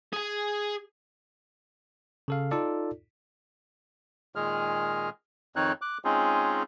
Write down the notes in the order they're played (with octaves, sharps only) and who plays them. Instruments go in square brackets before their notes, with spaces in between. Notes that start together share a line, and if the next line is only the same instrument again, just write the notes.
[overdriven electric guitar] G#4 G#5
[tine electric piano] C#3 A4 F5
D#4 F4 A4 D5
[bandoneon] A#2 D#3 G#3 G#4 F6
F2 D#3 C4 D#4 C#5 F#6
D6 F#6
G#3 C4 C#4 D#4 F4 G#4